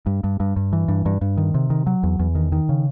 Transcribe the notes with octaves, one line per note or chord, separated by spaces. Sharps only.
G2
G2
G2
G2
E3
G2
G2
G2
D#3
C3
D#3
F#3
E2
E2
D#3
D#3
C#3